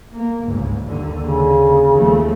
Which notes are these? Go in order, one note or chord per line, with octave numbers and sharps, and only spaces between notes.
A#3
G1 C#2 G#2
D#2 D3
C#3
D#2 F3 A3